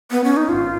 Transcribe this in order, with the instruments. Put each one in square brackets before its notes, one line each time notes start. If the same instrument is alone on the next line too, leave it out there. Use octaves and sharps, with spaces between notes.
[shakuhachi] B3
C#4
D#4
[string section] G#1 [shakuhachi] F4